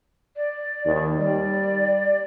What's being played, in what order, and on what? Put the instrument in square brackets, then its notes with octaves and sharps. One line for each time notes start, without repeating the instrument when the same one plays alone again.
[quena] D5
[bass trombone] D#2
[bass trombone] G3 [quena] D5